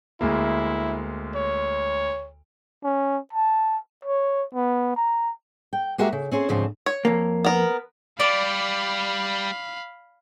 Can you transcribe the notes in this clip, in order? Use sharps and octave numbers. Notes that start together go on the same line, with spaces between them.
D2 G#3 A#3 E4
C#5
C#4
A5
C#5
B3
A#5
G5
G#3 A#3 F#4 G4 A#4 E5
C#3
C4 C#4 G#4 C5
D2 G#2 C#3 F3 C4
C#5
F2 A#3
B3 A#4
G3 D5 F5 B5